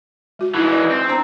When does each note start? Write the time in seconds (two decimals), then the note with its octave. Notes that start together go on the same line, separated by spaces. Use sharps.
0.39 G#3 F#4
0.55 E3 G#3 D#4 E4
0.71 D5
0.91 C4
1.08 D4 C5 A#5